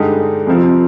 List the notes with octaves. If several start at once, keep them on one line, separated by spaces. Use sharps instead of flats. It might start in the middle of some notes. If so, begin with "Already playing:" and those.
Already playing: G2 D3 G#3 D#4 G4
F2 C3 F3 C4